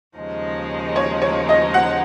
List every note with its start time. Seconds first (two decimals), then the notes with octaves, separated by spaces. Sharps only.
0.16 D#2 C#3 F3 G#3 D#4
0.96 C#5
1.22 C#5
1.49 D#5
1.74 F#5